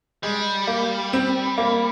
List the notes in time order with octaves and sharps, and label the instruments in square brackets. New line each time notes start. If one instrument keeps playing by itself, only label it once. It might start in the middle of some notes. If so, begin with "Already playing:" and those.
[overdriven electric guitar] G3 [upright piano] G#3
[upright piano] A#3
C4
A#3